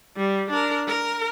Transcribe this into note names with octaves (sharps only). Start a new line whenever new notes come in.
G3
D4 A#4
A#4